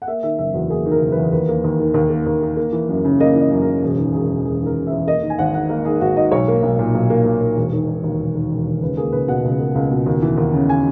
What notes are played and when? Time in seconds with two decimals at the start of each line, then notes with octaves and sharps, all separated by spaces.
0.02 F#5
0.08 A#3 E5
0.23 D#3 E5
0.39 F#1 E5
0.54 E2 F#4
0.69 A#3 G#4
0.86 D#3
0.91 A#4
1.02 F#1
1.12 E2 B4
1.32 D#2 B4
1.49 A#3
1.64 D#2
1.80 D#3
1.94 D#2
2.10 A#3
2.26 D#2
2.42 D#3
2.57 A#3
2.72 E3
2.89 F#2
3.05 C#3
3.20 A#3 D#5
3.35 E3
3.41 D#5
3.51 F#2
3.62 C#3 A#4
3.83 E1 G#4
3.98 D#3
4.13 E1 G#4
4.30 E2
4.45 E1 G#4
4.60 D#3
4.66 A#4
4.76 E1
4.87 E2 E5
5.07 A#3 D#5
5.23 D#3
5.30 G#5
5.39 G#1 F#5
5.54 G#2 F#5
5.69 A#3 A#4
5.85 D#3 G#4
6.01 G#1 F#4
6.16 G#2 D#5
6.32 B1 C#5
6.48 A#3
6.63 B1
6.79 A#2
6.95 B1
7.10 A#3
7.25 B1
7.41 A#2
7.56 E1
7.72 D#3
7.88 E1
8.03 D#2
8.19 E1
8.35 D#3
8.51 E1
8.67 D#2
8.82 C#2 B4
8.97 A#3 G#4
9.12 C#2 B4
9.28 B2 F#5
9.45 C#2
9.60 A#3
9.75 C#2
9.91 B2
10.06 D#2
10.22 E3
10.37 D#2
10.53 C#3
10.69 G#5